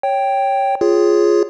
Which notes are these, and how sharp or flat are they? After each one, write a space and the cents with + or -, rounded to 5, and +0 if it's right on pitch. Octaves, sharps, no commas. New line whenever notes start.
C#5 +0 G5 +0
F4 +0 G#4 +0 C#5 +0